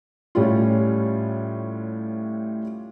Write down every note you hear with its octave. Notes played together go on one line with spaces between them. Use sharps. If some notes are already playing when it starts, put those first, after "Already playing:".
A2 G3 C#4 F4